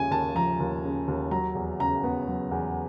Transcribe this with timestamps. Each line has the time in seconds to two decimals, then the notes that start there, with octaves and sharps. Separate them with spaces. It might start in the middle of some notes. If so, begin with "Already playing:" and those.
Already playing: D#2 C#3 F3 G#5
0.11 D#2 A5
0.35 F3 A#5
0.60 D#2
0.84 C#3
1.08 D#2
1.31 F#3 A#5
1.55 E2
1.79 C#3 A#5
2.04 B3
2.28 F#3
2.51 E2